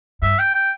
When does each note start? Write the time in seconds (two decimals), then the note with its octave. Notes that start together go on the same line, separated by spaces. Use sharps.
0.22 G2 E5
0.39 G5
0.54 G5